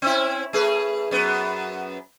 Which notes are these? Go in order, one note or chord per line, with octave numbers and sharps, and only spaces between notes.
C4 C#4 E4
A3 G#4 B4
F#2 B3